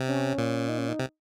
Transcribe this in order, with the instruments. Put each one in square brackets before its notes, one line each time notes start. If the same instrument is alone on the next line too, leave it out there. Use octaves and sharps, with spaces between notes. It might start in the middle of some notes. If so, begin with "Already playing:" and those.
Already playing: [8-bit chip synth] C3
[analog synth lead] C#4
[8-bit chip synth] A#2
[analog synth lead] D#4
C#4
D#4
[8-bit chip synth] C3